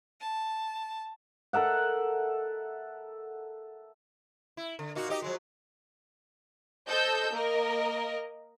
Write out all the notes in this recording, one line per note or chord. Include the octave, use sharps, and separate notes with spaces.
A5
A4 A#4 E5 F#5
E4
D3
A#2 D#4 F#4
D#4 G4 D#5
F3 F#3 G#3
A4 C5 D#5 E6 G6
A#3 A#4 D#5